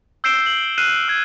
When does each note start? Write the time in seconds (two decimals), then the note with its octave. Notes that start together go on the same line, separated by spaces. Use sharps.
0.24 E6 G6 C7 D7 E7 G7
0.46 F#7
0.78 F6 F#6 C7 D#7 E7
1.08 E6 G#6